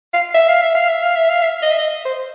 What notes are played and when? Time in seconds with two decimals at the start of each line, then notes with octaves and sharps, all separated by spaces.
0.13 F5
0.34 E5
0.48 F5
0.61 E5
0.75 F5
0.88 E5
1.03 F5
1.16 E5
1.29 F5
1.43 E5
1.62 D#5
1.71 E5
1.79 D#5
2.05 C5